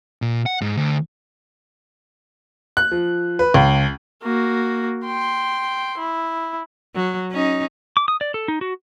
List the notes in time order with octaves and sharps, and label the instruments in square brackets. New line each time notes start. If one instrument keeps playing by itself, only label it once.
[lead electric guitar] A#2
F#5
G#2
D2
[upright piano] F#6
F3
B4
C#2
[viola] A#3 F#4
G5 C6
E4
[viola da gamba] F#3
C#4 D#4
[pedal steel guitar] D6
D#6
D5
A4
D#4
F#4